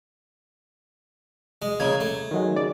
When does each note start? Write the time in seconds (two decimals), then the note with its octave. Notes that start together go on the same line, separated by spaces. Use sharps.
1.62 G#3
1.80 A#2 C#3 G#6
2.00 A3
2.31 D#3 F#3 G#3
2.56 C#3 D5 D6